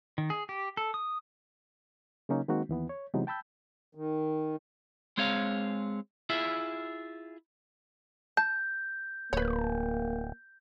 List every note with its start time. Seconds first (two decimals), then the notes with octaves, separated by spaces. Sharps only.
0.18 D#3
0.30 G#4
0.49 G4
0.77 A4
0.94 D#6
2.29 C#3 F#3 A#3 C#4 D#4
2.48 D#3 G#3 A#3 C4 D#4 F#4
2.69 D#2 E3 B3
2.89 C#5
3.14 C3 E3 F#3 G#3 B3 D#4
3.27 G5 A5 B5 E6 G6
3.95 D#3
5.18 G#3 C4 G#4 C#5 F5
6.30 E4 F4 G#4 E5
8.37 A5 G6
9.33 D1 A#3 B4 C#5